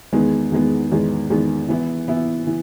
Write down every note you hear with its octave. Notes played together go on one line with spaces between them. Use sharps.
E2 D#3 G#3 B3
E2 D#3 G#3 B3
E2 D#3 G#3 B3
E2 D#3 G#3 B3
E3 B3 E4
E3 B3 E4
E3